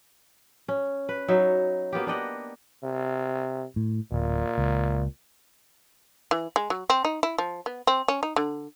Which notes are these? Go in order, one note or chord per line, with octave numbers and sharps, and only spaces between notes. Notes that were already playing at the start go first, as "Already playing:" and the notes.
C#4
B4
F#3 D#4 C#5 E5
A#3 B3 F4 G4
D4 G4 D#5 F#5
C3
A2
D1 A#2
C#2
E3
G#3
F#3
C4
D#4
E4
F3
B3
C4
C#4
D#4
D3